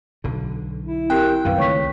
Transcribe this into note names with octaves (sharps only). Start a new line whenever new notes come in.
B1 D3
E4
C4 G4 A#4 G5 F#6
B1 F#2 D#3 B4 F5
C#2 D#3 A3 C#5 C#6 B6